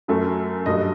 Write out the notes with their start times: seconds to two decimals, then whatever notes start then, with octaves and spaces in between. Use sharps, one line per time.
0.08 F#2 F#3 A3
0.66 G2 F#3 A3 D#5